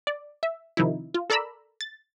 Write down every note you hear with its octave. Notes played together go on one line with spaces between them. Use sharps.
D5
E5
C3 D#3 F3 D#4 E4
F4
A4 A#4 D5 A#5 B5 E6
A6